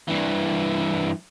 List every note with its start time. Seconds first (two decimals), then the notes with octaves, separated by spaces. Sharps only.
0.08 G2 E3